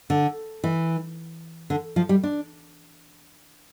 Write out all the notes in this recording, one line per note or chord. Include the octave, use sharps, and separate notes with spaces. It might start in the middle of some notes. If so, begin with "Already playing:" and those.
D3
E3
D3
F3
G3
D4